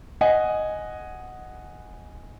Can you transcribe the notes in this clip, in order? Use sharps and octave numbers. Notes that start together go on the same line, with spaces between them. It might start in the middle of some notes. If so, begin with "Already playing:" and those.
D#5 F#5 G#5